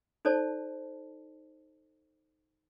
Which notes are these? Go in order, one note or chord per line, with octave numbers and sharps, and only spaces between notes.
D#4 A4 C5 D5 A5